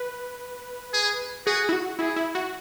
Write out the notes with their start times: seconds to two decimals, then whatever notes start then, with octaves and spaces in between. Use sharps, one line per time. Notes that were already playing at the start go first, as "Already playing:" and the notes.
Already playing: B4
0.93 G#4
1.47 F#4 G#4
1.69 E4
1.73 F#4
1.99 E4 G#4
2.16 E4
2.35 F#4